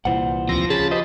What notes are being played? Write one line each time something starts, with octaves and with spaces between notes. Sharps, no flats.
C2 A#2 E3 C5 F#5
D2 F3 C4 A#6
C#3 G#4 A5 B5 A6
G4 B4 C5 D#5 B5